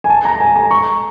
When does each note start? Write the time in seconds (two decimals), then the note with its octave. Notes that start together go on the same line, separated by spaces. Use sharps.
0.04 G#5
0.10 A5
0.25 A#5
0.40 G#5
0.56 A#5
0.71 C#6